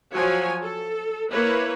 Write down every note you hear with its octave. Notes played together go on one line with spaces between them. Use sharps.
F3 F#3 C#5 G#5
A4
A#3 E4 B4 C#5